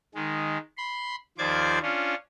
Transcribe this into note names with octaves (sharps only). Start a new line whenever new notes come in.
D#3 G#3
B5 C6
D#2 F3 C5 D5 D6 G#6
C#4 D4 F4